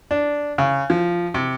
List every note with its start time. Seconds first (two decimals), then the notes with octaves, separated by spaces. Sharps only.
0.11 D4
0.58 C#3
0.90 F3
1.34 C3